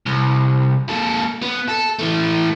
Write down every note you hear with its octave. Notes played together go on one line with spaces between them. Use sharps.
C2
A#3 A4
B3
A4
E3 A3